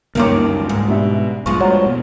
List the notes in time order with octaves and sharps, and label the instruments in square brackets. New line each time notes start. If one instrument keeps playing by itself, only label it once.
[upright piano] G1 A#2 D6 [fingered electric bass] C#2 F#2 [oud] D#3 A#3 C#4
[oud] G#2
[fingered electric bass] B2 [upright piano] G3 D4 E5
[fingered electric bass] A#1 G2 A#2 [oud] F3 G#3 [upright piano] C#6
[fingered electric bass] G2 [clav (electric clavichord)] F#3
[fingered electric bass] B2 G#3 B3